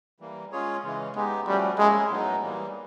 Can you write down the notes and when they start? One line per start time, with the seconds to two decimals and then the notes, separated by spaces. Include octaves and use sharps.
0.20 E3 G3 A#3
0.52 G#3 C#4 F4 G#4 C#5
0.83 C#3 E3 G#3
1.15 G#3 B3 D#4 G4
1.46 F3 G3 A3 C#4 F#4
1.79 G#3 A#3 C#4 E4
2.10 A2 F#3 B3 D#4
2.42 E3 G3 A#3